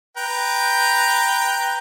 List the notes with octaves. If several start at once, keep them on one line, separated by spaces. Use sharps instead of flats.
B4 G5 A#5